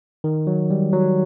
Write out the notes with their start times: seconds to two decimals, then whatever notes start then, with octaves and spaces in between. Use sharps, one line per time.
0.24 D#3
0.47 F#3
0.70 G3
0.93 F#3